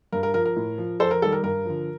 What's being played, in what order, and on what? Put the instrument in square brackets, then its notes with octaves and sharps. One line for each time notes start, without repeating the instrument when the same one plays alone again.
[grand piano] G2 A#4
A#4
F3 A#4
A#4
A2
F3
F2 A4 C5
A#4
D#3 G3 A4
A#4
G2 A#4
D3 F3